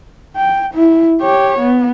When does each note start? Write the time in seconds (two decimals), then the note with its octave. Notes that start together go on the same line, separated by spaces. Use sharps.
0.37 G5
0.74 E4
1.22 G4 C#5
1.59 B3